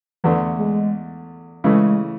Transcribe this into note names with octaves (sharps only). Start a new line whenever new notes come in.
E2 D3 E3 A3
G#3
C#3 E3 G#3 A3